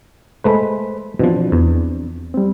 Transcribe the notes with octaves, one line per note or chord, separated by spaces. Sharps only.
G#3 A3 B4 C5 B5
B2 E3 F3 C4 D4
E2
G3 C4